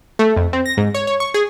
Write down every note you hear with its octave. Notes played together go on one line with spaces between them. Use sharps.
A3
F2
C4
A#6
G#2
C#5
C#5
C#6
G#4